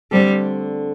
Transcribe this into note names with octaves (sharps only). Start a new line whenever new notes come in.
D3 G3 A3 C4 A4